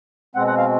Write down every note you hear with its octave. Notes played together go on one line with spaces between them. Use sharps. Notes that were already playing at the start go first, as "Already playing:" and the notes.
B2 G#3 C4 F#5
F#5
F5